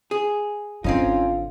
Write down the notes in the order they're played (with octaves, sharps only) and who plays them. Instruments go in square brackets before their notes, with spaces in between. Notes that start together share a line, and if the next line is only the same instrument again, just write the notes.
[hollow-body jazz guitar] G#4
[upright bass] G#1 D3 [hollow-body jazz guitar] C4 C#4 D#4 [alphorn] F4